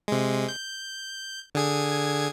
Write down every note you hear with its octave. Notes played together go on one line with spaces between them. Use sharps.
C3 G#3
G6
D3 G#4 G#6